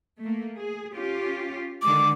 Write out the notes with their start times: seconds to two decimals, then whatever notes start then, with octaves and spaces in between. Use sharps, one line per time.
0.21 A3 A#3
0.59 G#4
0.94 C#4 F4 G4
1.82 D3 D#3 G#3 D6